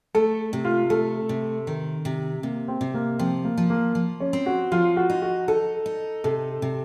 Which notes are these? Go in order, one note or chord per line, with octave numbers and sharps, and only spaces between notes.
A3 A4
C3
F4
A3 A4
C3
D#3
C3
C3 A#3
C4
C3
A#3
F3 C4
A#3
F3
A#3
F3
C#4
C4
F#4
F3 F4
F#4
D#4
F#4
D#4 A4
D#4
C3 A4
C3